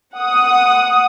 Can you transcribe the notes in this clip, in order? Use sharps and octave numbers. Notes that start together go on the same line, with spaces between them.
F#5 D#6